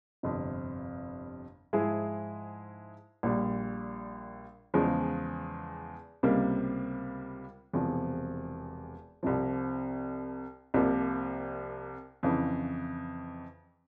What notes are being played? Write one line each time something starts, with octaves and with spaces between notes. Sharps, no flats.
G1 F2 C3
G#2 F3 G#3 E4 G#4
A#1 A#2 G3
E2 C#3 F3 G#3
C#2 C3 G3 A#3
E1 E2 C3 F3
C2 C3 F3
C2 C3 F3 A#3
F2 C#3 E3